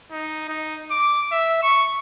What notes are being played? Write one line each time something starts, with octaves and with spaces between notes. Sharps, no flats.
D#4
D#4
D6
E5
C#6